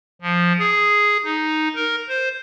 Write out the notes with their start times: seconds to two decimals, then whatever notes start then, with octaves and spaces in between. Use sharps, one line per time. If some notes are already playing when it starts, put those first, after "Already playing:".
0.22 F3
0.59 G#4
1.24 D#4
1.75 A#4
2.08 C5